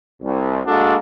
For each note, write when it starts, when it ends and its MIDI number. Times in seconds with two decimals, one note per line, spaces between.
0.23 0.60 36
0.66 0.95 56
0.66 0.95 58
0.66 0.95 62
0.66 0.95 66
0.66 0.95 69